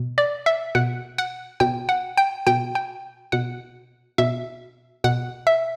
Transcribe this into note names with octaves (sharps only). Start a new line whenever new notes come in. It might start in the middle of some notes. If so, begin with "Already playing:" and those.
Already playing: B2
D5
E5
B2 F#5
F#5
B2 G5
F#5
G5
B2 G5
G5
B2 F#5
B2 E5
B2 F#5
E5